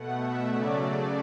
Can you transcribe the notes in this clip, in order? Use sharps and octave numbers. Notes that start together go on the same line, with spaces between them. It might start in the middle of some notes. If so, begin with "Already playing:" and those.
Already playing: B2 A3 F#5
E5
C#3 F#3 A3 D5